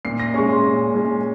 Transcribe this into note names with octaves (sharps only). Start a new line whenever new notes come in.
A#2 C7
A#6
G#3 C#4 C#6
C6
A#2
G#3 C#4